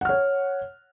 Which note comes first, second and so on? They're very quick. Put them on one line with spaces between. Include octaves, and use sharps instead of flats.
F#5 F6 C#5